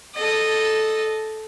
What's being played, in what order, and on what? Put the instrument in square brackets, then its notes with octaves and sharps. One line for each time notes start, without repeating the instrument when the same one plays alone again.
[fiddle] A4 D#5